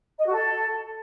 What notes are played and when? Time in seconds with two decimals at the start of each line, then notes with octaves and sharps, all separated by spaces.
0.17 D#5
0.25 F#4
0.32 A4